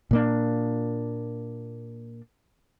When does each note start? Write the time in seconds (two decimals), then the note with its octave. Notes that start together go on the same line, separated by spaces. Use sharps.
0.11 A#2 A#3 D4